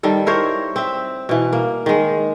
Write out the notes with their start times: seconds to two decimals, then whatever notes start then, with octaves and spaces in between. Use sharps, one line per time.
0.03 D#3 G3 A4
0.26 E4 A#4 C5 C#5
0.76 C4 E5
1.29 B2 E3
1.53 A#3
1.86 D#3 G#3